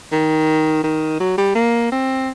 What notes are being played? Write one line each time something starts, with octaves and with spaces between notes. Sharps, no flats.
D#3
D#3
F#3
G3
A#3
C4